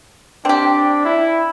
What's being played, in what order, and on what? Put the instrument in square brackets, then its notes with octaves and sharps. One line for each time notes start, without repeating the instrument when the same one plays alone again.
[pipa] C4 G4 [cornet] D4
[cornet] E4